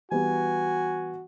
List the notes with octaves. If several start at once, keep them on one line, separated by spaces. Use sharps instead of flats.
E3 G3 B3 F#4 G#5